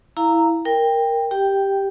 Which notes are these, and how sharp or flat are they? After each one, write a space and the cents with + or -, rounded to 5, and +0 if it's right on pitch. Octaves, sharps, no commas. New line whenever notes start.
E4 +0 F5 -15 A#5 -10
A#4 +0 G5 +15
G4 +0 G5 +0